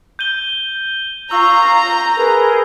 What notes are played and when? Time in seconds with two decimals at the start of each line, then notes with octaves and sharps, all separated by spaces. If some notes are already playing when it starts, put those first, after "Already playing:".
0.19 G6 D#7 G7
1.31 F4 A#5 C#6 E6
2.17 G#4 A#4 B4